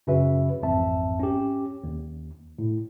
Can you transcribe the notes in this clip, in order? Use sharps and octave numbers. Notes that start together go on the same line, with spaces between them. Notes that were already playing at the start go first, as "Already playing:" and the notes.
F#2 C#3 C#4 F#4 B4 E5
A1 F2 G#2 C4 E5 A5
C#4 G4
D#2
A2